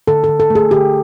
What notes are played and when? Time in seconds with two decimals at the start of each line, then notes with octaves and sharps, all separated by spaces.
0.07 D3 A4
0.24 D3 A4
0.40 A4
0.50 A3
0.55 G#4
0.71 D3 G4